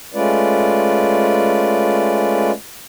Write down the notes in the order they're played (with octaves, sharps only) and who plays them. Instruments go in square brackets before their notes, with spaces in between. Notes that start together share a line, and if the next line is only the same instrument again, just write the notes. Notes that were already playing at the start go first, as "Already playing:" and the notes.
[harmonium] G#3 A3 C#4 F4 B4 D5